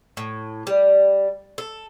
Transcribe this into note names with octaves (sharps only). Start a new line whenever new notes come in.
A2
G3
A4